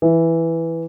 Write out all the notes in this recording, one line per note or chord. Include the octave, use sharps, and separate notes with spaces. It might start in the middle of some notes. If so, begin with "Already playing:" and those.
E3